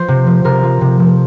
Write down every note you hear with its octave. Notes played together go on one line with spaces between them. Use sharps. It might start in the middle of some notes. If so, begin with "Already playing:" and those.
Already playing: F3 C5
C3
F3
C3 A#4
F3
C3
F3